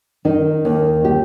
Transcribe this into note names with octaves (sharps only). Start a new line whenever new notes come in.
D#3 D#4
D#2
G4